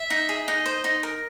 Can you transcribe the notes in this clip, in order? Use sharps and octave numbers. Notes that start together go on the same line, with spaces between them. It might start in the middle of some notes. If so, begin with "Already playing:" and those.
Already playing: E5
D#4
G#4
D#4 D#5
C5
D#4
A#4